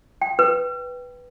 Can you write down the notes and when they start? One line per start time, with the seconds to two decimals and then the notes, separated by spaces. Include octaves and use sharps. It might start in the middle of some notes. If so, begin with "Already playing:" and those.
0.21 G5
0.39 B4